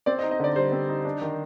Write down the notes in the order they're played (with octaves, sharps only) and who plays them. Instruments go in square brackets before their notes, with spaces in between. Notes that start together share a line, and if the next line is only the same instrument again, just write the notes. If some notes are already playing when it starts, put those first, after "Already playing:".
[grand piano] C4 [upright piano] D5
[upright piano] D#5
[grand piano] D#4
[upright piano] D#5
[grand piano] D3 [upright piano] D5
[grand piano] G3 [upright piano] C5
[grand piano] C4
D#4
D4
D#3